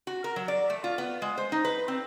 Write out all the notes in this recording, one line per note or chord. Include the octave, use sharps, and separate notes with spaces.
F#4
A#4
F#3
D5
A3
F4
B3
G#3
C5
D#4
B4
C4